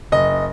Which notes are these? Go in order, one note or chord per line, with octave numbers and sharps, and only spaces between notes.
F#1 D#5